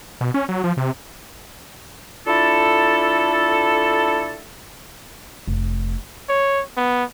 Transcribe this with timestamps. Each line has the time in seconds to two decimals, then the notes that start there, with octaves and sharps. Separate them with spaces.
0.21 B2
0.34 C#4
0.49 F#3
0.64 F3
0.77 C3
2.27 A3 D4 E4 F4 A4
5.47 F1
6.29 C#5
6.77 B3